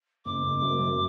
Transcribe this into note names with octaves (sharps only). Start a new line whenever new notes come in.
F#1 D6
F#1
F#2
F#2